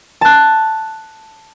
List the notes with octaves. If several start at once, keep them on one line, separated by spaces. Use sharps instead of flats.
A5 F#6